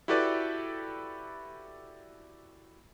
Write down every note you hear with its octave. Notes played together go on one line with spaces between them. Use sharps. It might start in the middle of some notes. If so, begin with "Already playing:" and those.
E4 F#4 G4 A4 B4 D5